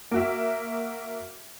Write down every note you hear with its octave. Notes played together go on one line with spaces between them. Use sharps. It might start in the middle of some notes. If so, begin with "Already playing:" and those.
A#3 F#4 E5